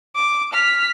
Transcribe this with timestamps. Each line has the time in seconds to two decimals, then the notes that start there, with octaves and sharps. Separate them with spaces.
0.15 D6
0.54 F6 B6